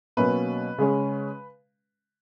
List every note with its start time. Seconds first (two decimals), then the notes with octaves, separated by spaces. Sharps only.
0.17 B2 F#3 A#3 C#4 B4
0.78 C#3 G#3 C#4